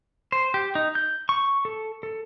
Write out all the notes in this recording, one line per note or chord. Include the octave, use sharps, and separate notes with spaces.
C5
G4
D#4
G6
C#6
A4
A4